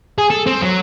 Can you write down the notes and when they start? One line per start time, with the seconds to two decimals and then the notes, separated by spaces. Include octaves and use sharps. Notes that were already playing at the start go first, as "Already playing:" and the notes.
0.18 G#4
0.30 A4
0.47 C4
0.62 F#3